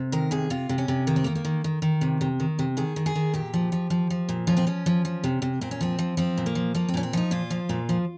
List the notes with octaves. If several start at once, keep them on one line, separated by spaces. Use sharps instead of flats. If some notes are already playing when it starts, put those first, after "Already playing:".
Already playing: C3
D#3 A#4
C3 G#4
C3 F4
C3
C#4
C3
D#3 A#3
C4
D#3 A#3
A#3
D#3
D#3
D#3
C3
C3
D#3
C3
D#3 G#4
D#3
G#4
D#3
A#2 G4
F3
F3
F3
F3
A#2
F3 C#4
C4
F3 C#4
F3
F3
C3
C3
A#2 C4
C#4
F3 C4
F3
F3 C4
A#2
A#3
F3
F3 A#3
C4
A#2 C#4
C4
F3 D#4
A#2 F4
F3
A#2
F3